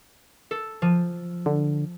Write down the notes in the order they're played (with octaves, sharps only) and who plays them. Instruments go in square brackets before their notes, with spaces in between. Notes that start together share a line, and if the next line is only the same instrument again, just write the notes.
[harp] A4
F3
[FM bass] D3